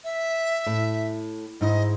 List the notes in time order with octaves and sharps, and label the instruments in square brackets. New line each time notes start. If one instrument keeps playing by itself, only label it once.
[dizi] E5
[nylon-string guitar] A2
[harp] G#2 D#4 E4 [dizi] D#5